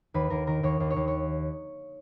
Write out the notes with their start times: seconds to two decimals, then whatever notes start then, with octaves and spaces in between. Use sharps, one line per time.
0.14 D#2 B4
0.30 D#2 A#4
0.47 D#3 A#4
0.63 D#2 C#5
0.80 D#2
0.90 C#5
0.96 D#2
1.07 C#5